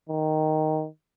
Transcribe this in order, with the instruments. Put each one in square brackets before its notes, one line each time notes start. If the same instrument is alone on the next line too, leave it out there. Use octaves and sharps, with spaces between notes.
[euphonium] D#3